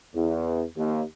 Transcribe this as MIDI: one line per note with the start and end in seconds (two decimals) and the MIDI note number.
0.14 0.65 40
0.77 1.02 39